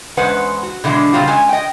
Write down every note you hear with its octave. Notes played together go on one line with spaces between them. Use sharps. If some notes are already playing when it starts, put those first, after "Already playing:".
E2 G#3 C#4 B4 C5 F#5
F#4
B2 D3 E3 G3 G#3
A#2 C#3 G3 C4 F4 F#4
G#3 C#4 G#5
D#5 G5